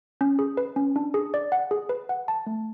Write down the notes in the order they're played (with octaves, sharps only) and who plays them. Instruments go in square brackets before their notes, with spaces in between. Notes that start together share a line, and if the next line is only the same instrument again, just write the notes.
[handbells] C#4
G#4
B4
C#4
D4
G#4
D5
F#5
G#4
B4
F#5
A5
A3